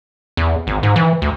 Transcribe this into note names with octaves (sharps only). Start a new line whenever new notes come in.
E2
G#1
G#2
E3
D2